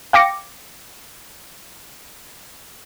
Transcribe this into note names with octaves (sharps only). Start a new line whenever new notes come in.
F5 G5 D6 A#6 C#7